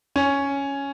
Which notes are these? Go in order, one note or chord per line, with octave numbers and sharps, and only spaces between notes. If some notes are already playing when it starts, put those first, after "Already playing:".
C#4